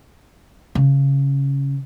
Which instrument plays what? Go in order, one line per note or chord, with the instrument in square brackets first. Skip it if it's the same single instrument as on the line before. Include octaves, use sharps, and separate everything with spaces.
[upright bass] C#3